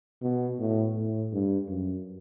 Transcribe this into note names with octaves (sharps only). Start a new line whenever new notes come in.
B2
A2
A2
G2
F#2